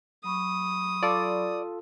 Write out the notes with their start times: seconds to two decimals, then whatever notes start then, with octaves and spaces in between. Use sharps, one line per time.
0.24 F#3 B5 C#6 D#6
1.03 F4 A4 D5